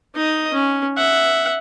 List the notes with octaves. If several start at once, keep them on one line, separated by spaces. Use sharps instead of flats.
D#4 D#5
C#4
E5 F#5